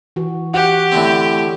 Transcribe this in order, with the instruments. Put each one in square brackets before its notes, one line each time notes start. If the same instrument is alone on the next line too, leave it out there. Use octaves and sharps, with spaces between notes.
[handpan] E3 F#4
[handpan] F#4 F#5 [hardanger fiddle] G4
[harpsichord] A2 D3 C4